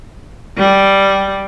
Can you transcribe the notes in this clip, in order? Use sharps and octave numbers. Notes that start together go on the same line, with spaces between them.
G3